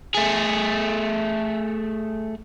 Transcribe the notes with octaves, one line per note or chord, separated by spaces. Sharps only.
A3 G#4